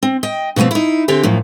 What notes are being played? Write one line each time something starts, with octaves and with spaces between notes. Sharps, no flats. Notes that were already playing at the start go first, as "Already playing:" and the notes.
C4
D#5 G5
B2 F3 G3 A3 C4
D#4 E4
D3 C4 G4 G#4
F#2 A2 F3